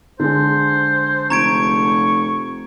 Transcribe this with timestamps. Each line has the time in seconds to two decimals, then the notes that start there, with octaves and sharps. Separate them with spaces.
0.20 D3 G#3 C5
1.30 F1 A#5 C#6 G#6 D7